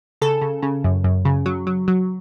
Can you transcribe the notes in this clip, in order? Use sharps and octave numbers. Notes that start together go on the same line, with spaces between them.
C#3 A4
C#3
C#3
F#2
F#2
C#3
F#3
F#3
F#3